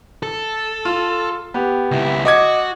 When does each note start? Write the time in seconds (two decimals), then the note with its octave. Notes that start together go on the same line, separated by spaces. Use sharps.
0.23 A4
0.85 F4
1.54 B3 G4
1.91 C#2 E4
2.25 F#4 D#5 D6 G#6